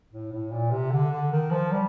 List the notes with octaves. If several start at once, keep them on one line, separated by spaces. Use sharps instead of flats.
A2
A2
A#2
C3
D3
D3
D#3
F3
G3